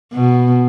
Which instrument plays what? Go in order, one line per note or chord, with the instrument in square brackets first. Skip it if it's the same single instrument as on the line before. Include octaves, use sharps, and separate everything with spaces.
[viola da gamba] B2